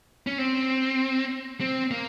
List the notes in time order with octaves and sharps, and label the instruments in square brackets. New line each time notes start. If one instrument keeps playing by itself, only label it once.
[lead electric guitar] C#4
C4
C4
A#3